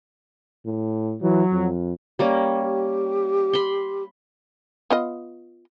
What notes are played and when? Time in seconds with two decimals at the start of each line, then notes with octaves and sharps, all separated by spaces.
0.66 A2
1.22 E3 F#3
1.52 F2
2.19 G3 A#3 C#4
2.62 G4
3.53 B5 C6
4.90 B3 F4 D#5